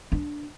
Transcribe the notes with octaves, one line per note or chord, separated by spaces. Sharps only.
D4